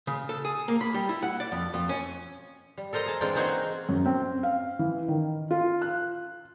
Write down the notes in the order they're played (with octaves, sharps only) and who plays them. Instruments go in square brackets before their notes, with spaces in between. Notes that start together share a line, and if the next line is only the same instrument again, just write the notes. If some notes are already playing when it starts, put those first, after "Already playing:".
[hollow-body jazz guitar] C#3
A4
G#4
A#3
B5
G3
E4
F#5
D5
F2
F2
C#4
[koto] G3
A4 A#4 C5 D#5 A#5
G#4 A5
E3 G#3 C4 D4 F4 G5
A#3 C4 D#4 F#4 G#4 A#4
[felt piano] F#2
C4
F5
E3
D#3
F4
F#6